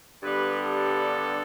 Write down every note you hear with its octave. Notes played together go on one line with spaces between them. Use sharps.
G2 D3 G3 B3 B4
A4